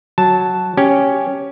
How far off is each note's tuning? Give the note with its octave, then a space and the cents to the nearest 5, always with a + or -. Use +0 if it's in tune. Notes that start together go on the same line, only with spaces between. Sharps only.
F#3 +0 A5 +0
C#4 +5 G4 +0